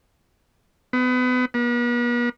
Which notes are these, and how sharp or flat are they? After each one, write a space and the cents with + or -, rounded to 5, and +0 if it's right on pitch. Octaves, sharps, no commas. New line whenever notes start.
B3 +30
B3 -45